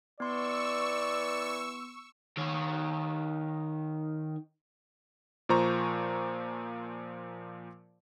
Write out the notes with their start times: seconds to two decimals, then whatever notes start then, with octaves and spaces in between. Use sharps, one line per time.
0.20 E3 B3 D5 C6 C#6 E6
2.37 D#3 C#5
5.49 A#2 F3 C5 A#5 C#6